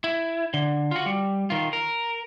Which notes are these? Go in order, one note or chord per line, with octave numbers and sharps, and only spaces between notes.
E4
D3
F4 F#4
G3
D#3 F4
A#4